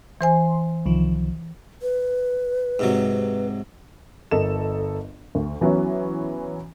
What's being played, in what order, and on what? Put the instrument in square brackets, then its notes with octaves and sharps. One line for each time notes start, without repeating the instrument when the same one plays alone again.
[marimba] E3 C5 G#5 [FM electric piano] C6
[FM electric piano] C2 D#3 F3
[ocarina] B4
[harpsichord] G#2 C3 F#3
[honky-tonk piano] G1 A4 A#4 D#5 E7
D2
E3 F#3 B3 C#4 E4